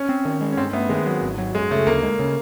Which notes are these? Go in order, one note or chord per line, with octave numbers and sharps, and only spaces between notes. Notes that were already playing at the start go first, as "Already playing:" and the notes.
Already playing: C#4
C4
D#3
G#3
C#4
G2 C4
A3 B3
D#3 G#3
F#3
G#1
F#3
F#2 G#3
C#3 A3
D2 A#3
G#3
C#3